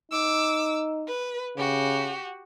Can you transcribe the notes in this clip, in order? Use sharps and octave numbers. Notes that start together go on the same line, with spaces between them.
D#4 D6 E6
B4
C#3 F#4 G4